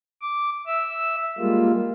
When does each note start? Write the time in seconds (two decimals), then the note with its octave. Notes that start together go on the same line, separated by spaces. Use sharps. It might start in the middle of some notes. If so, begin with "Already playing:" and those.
0.22 D6
0.67 E5 E6
1.38 G3 G#3 A#3 F4